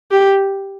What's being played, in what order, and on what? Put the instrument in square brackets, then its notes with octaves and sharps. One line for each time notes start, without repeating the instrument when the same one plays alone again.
[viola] G4